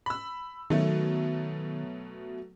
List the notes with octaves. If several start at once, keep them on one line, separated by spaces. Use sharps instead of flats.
B5 E6
B2 D#3 F#3 A3